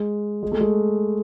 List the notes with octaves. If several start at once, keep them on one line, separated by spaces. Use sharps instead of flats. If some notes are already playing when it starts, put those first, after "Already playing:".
Already playing: G#3
G#3
A3
G#3